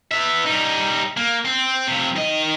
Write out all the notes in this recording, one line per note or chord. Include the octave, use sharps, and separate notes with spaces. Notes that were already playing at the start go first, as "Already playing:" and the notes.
B3 E5
G3 D#4
A#3
C4
F2 C3
D#3 D#5